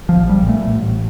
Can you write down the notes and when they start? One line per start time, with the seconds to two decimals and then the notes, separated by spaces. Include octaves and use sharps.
0.09 F3
0.16 A#1
0.29 G3
0.42 A#2
0.49 A3
0.69 A1